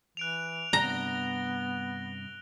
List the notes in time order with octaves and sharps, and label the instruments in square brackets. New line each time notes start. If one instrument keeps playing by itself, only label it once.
[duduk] E3 [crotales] F#6 D7 F7
[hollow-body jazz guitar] G2 C3 D4 [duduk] B3 [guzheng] A#5 [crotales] A#6 G7